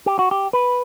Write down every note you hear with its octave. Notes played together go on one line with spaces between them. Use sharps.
G4
F#4
G4
B4